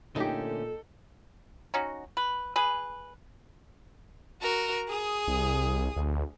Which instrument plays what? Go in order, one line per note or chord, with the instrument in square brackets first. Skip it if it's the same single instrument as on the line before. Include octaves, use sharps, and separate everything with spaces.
[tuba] A#2 [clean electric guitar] D3 A3 C#4 [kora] D#4 G4 [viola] A4
[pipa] C#4 D#4 F#4
B4
G#4 B4
[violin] F#4 A#4
G#4 D#6
[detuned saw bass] C2
D2